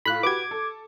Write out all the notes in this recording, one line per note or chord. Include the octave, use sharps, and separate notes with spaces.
A2 F4 B5 F#6
F#4 G4 B4 D6 G#6
A4